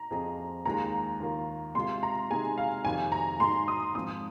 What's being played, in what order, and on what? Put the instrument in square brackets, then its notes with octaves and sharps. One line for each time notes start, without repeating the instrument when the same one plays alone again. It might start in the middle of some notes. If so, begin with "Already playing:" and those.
Already playing: [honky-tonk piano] A#5
[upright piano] F2 F3 C4 G#4 D#5
[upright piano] D#2 D#3 G#3 F4 G#4 [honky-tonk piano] A#5
[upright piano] D#2 D#3 A#3 F4
[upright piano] C3 G#3 F4 [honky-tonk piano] C6
[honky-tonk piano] A#5
[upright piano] C3 G#3 D#4 G#4 [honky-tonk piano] G#5
[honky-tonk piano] F5
[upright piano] F2 C3 D#3 [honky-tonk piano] G#5
[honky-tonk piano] A#5
[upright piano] G#2 G#3 D#4 [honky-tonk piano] C6
[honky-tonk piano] D#6
[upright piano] G#2 F3 C4 [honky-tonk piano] D#6